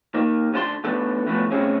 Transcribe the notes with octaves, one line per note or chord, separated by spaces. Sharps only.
D#3 A#3
D2 D3 F4 A5 C6
A2 E3 B3 D4 A4
A2 E3 F3 A3 B3
B1 A2 C4 C#4 G#4